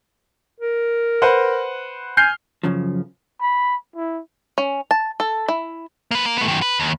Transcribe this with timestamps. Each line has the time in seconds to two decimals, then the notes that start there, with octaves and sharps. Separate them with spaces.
0.60 A#4
1.22 B4 C5 F#5
2.17 G#5 F6 G6 C7
2.63 F#2 C#3 F3
3.41 B5
3.96 E4
4.58 C#4
4.91 A5
5.20 A4
5.48 E4
6.11 A#3 B4
6.26 A#3
6.37 A3 B3
6.48 F#2 D#3
6.62 B4
6.80 D#2